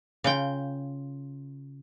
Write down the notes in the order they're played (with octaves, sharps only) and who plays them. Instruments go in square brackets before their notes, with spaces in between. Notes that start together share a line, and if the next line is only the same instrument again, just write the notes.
[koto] C#3 F4 G5